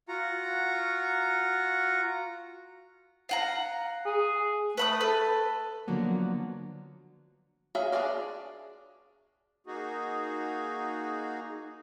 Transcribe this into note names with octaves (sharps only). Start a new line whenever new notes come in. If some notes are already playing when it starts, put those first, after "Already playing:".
F4 F#4 F#5 A#5
F5 F#5 A#5
G#4
A3 B4 B5 D#6
A4 B4
D3 F3 F#3 A#3 B3
F#3 G#4 E5 F5
D4 G#4 C#5 D5 F5
A#3 D#4 F#4 G#4